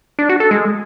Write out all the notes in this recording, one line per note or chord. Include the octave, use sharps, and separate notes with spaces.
D4
F#4
A4
G#3